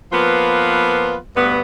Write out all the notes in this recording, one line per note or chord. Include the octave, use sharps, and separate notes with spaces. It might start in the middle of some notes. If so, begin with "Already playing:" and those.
F3 A#3 B3 F4 B4
D2 G2 B3